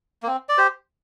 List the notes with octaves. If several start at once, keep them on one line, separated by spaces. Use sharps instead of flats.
A#3
C4
D5
G4 C5